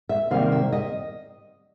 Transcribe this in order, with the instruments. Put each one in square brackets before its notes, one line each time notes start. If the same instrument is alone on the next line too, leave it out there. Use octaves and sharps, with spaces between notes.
[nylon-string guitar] E5
C3 D#3 G3 A#3 F5
E5
D#5